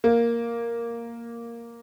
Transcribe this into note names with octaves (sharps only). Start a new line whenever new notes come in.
A#3